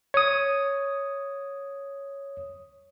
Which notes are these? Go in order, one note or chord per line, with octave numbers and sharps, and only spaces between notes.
C#5 D#6